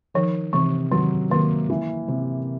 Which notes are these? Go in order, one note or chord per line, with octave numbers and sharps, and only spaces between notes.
D#3 F3
C3 E3
D#3 F#3
D#3 A#3
E3
C3